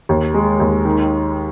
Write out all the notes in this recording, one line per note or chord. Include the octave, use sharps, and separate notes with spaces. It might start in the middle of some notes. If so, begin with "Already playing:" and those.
D#2
G#3
D#2
D#3